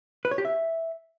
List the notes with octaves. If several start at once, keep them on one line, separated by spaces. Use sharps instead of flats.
B4
C#5
G4
E5